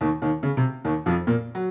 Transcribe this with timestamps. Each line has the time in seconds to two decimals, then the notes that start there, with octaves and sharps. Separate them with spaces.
0.01 D#2 D#3
0.22 D#2 D#3
0.43 C#3
0.57 C3
0.85 D#2 D#3
1.06 F2 F3
1.27 A#2 A#3
1.55 F#3